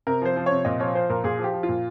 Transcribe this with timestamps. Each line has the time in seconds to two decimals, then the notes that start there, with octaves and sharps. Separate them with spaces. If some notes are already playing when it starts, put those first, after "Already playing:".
0.07 C3 A#4
0.22 F3 C5
0.36 F3
0.46 C3 C#5
0.65 A#2 D#5
0.80 F3 C#5
0.95 F3 C5
1.09 A#2 A#4
1.24 A#2 G#4
1.39 F3
1.44 G4
1.53 F3
1.63 F4
1.69 A#2